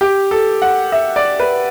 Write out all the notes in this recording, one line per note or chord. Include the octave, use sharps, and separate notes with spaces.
G4
A4
F#5
E5
D5
B4